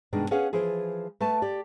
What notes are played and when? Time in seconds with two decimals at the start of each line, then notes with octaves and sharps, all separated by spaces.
0.13 G2 B2 D#3 G#3 D4
0.31 C#4 G#4 B4 F5 F#5
0.53 E3 F3 G#4
1.20 A3 B4 A5
1.42 G4 D5